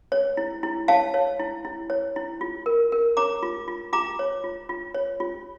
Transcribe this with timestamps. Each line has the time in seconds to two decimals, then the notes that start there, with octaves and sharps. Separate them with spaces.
0.12 C#5
0.37 E4
0.63 E4
0.88 C#5 F5 A5
1.14 C#5
1.40 E4
1.65 E4
1.90 C#5
2.16 E4
2.41 F4
2.66 A#4
2.92 A#4
3.17 C#5 A#5 D6
3.43 F4
3.68 F4
3.93 F4 A#5 D6
4.19 C#5
4.44 F4
4.69 F4
4.94 C#5
5.20 F4